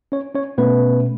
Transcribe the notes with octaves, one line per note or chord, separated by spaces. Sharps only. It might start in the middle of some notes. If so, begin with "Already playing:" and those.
C#4 C#5
C#4 C#5
B2 A3 B3 C#4 B4